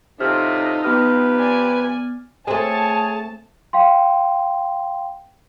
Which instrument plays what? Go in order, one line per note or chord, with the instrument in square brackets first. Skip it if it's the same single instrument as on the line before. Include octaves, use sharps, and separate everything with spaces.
[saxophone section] A2 C3 [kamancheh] D#4 [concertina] F4 A4 [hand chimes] F6
[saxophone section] C3 F3 G4 [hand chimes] B3 F6 [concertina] B4
[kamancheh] D5 G#5
[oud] A3 C4 [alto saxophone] G#4 [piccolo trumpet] C#5 [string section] A5
[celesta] F5 G5 C6